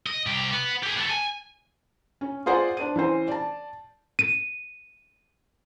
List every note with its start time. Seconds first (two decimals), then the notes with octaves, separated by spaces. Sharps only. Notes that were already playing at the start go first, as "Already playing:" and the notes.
0.06 D#5
0.26 C2 G4
0.52 B3
0.83 G4 G#4
0.95 B3 A4
1.10 G#5
2.21 C#4
2.46 F4 G#4 C5 D5 F#5
2.77 D4 C5 D5 D#7
2.96 E3 C#4 C5
3.28 D5 A5
4.19 D#7